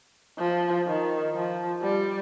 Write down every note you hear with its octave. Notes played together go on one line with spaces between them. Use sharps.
F3
D#3
F3
G3